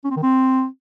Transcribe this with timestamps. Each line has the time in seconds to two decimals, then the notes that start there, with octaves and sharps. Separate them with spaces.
0.05 C#4
0.11 C4
0.17 D#3
0.23 C4